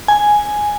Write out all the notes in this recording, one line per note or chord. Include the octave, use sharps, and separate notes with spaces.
G#5